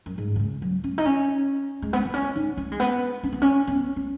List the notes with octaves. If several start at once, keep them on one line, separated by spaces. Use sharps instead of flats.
F#2
G#2
B2
C#3
F#3
C#4
D#4
C#4
G#3
B3
B3
C#4
D#4
C#4
G#3
B3
C#4
B3
C#4
B3
C#4